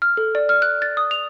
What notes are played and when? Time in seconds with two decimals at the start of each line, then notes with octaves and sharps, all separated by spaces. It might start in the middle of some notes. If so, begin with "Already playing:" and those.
0.02 F6
0.17 A4
0.35 D5
0.49 F6
0.62 F#6
0.82 A6
0.97 D#6
1.11 F7